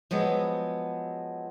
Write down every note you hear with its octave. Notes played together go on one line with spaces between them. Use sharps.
F3 F#3 G#3 B3